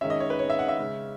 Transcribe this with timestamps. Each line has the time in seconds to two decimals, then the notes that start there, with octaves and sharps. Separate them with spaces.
0.01 D#3 G#3 C#4 E5
0.10 D#5
0.20 C#5
0.30 B4
0.39 C#5
0.50 E5
0.59 F#5
0.68 E5
0.78 C#3 G#3 C#4